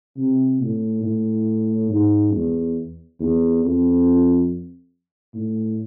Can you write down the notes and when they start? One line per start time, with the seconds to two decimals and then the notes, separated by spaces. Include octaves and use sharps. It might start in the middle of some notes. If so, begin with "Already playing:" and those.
0.17 C3
0.61 A2
1.03 A2
1.90 G#2
2.32 E2
3.19 E2
3.62 F2
5.34 A2